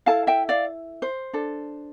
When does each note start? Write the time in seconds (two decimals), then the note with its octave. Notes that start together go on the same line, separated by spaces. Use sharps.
0.06 E4 A4 F5 A5
0.27 E5 G5
0.49 D5 F5
1.02 C5
1.33 D4 A4